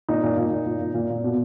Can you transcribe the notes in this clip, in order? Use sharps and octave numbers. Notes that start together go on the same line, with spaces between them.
A#2 D#4
A#2
A#2
A#2
A#2
A#2
A#2
A#2
B2